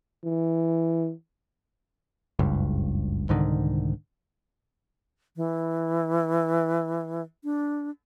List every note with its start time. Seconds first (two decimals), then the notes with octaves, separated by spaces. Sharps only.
0.24 E3
2.39 F#1 C#2 G2
3.29 C2 G#2 D3 D#3
5.37 E3
7.44 D4